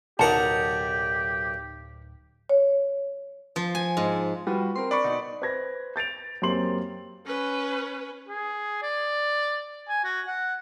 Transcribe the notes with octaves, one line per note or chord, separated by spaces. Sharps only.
D1 B1 D#4 G4 A#4 D5 F#5 A5
C#5
F3
G#5
G#2
G3 F4 F#4 B4
C4 A#4 C6
D4 D5 B5 C#6
B2 D#4
B4 C5 G#6 A#6
G6 A6 D7 F7
F#2 A#3 C4 G4 C6 F#7
C#4 B4
G#4
D5
G#5
F#4
F#5